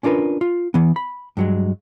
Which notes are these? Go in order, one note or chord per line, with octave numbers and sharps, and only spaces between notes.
C#4 D4 F4 A#4 B4
F4
E3 B3
B5
G2 F#3 G#3